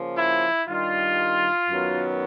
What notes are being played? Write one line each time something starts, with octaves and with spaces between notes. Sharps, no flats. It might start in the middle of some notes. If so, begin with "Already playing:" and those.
Already playing: C#3 F3 A#3
E4
G2 D#3 G3 F4
F#2 D#3 F#3 B3